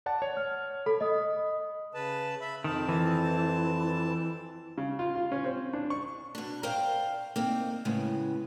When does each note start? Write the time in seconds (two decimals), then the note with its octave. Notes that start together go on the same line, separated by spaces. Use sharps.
0.06 D5 F#5 A5
0.22 C#5
0.37 F6
0.86 A4 B5
1.01 D#5 D#6
1.94 C#3 B4 A5
2.41 E5 B5
2.64 F2 D#3 C4 A5
2.89 E3
4.78 C#3
4.99 F4
5.15 F4
5.32 C#4
5.44 C4
5.73 D4
5.90 C#6
6.35 B2 D4
6.63 A#4 C5 D5 F5 G5
7.36 A#3 C4 D#4
7.85 A2 C#3 G#3 B3